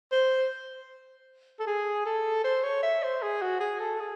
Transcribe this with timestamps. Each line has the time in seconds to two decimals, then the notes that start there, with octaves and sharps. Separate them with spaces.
0.12 C5
1.60 A4
1.67 G#4
2.06 A4
2.44 C5
2.63 C#5
2.83 E5
3.03 C5
3.22 G#4
3.42 F#4
3.60 G#4
3.79 A4
4.00 G#4